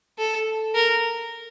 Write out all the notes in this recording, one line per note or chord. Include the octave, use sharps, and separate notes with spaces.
A4
A#4